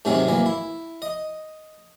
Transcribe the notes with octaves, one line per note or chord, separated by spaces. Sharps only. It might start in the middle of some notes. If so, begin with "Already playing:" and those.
G#2 C3 D#3 F#3 G#3 C4
E3 F#3 A#3
E4
D#5